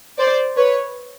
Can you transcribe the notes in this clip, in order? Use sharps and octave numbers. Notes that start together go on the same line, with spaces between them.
C5 D5
B4 C#5